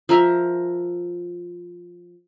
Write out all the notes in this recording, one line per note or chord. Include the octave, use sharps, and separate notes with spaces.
F3 A#4 E5 A#5